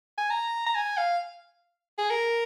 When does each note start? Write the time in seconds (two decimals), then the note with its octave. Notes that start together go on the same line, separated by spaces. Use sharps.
0.18 G#5
0.30 A#5
0.66 A#5
0.75 G#5
0.97 F5
1.98 G#4
2.10 A#4